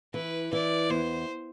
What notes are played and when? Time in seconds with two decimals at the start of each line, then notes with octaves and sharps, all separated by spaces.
0.14 E3 B4
0.53 E3 D5
0.90 E2 C5